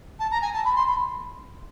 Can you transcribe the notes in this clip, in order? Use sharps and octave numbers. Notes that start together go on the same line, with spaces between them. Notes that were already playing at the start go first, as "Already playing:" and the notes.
A5
A#5
G#5
A5
B5
C6
B5